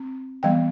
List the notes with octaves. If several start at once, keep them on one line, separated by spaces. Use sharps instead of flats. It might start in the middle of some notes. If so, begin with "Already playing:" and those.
Already playing: C4
E3 G3 B3 G5